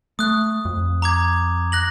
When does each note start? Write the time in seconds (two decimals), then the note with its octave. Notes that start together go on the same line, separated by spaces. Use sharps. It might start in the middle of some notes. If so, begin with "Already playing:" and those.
0.19 A3 D#6 F#6
0.65 F2
1.02 A#5 D6 G#6
1.72 F#6 A#6 F#7